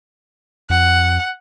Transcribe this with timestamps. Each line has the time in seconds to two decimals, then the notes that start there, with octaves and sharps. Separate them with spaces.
0.70 F2 F#5